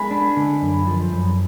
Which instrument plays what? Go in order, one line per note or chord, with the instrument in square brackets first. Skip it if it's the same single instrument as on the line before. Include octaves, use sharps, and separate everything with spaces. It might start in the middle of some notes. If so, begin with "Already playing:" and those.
Already playing: [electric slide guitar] G#3 [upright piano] G#5 B5
[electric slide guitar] D4
D3
F#2
F3
F#2